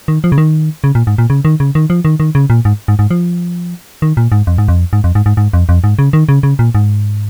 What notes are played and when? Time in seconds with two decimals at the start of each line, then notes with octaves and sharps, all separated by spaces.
0.08 D#3
0.24 F3
0.32 C#3
0.38 D#3
0.84 C#3
0.95 A#2
1.07 G#2
1.18 A#2
1.30 C#3
1.45 D#3
1.60 C#3
1.75 D#3
1.90 F3
2.05 D#3
2.20 D#3
2.35 C#3
2.50 A#2
2.65 G#2
2.88 G#2
2.99 G#2
3.11 F3
4.02 D#3
4.17 A#2
4.32 G#2
4.47 F2
4.58 G#2
4.68 F2
4.93 G#2
5.04 F2
5.15 G#2
5.26 G#2
5.37 G#2
5.53 F2
5.69 F2
5.84 G#2
5.99 C#3
6.13 D#3
6.29 C#3
6.43 C#3
6.59 A#2
6.75 G#2